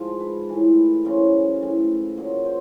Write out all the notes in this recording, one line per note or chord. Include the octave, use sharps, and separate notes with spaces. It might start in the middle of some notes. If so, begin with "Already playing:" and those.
Already playing: G#2 F3
B4
A2 E3
F#2 C#3 E3 C5
A2 E3
A#2 F#3
C5